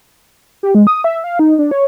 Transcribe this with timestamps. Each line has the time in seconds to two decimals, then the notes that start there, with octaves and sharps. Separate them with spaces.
0.63 G4
0.75 G#3
0.87 D#6
1.04 E5
1.24 F5
1.39 D#4
1.59 D4
1.71 C#5